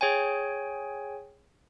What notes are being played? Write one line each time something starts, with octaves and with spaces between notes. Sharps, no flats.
G#4 C#5 G5 G#5